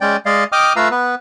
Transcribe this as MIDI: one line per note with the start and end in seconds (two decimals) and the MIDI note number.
0.01 0.17 56
0.01 0.17 61
0.01 0.17 74
0.01 0.17 79
0.26 0.44 56
0.26 0.44 74
0.26 0.44 75
0.26 0.44 77
0.52 0.73 75
0.52 0.73 79
0.52 0.73 86
0.52 0.73 87
0.52 0.73 89
0.76 0.89 57
0.76 0.89 65
0.76 0.89 71
0.76 0.89 77
0.76 0.89 82
0.76 0.89 88
0.91 1.15 59
0.91 1.15 71